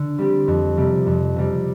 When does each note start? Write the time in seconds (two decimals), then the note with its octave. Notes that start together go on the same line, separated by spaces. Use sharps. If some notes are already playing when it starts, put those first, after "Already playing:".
Already playing: D3
0.18 G3 C4 G4
0.48 F2
0.77 C3 G3
1.06 F2
1.36 C3 G3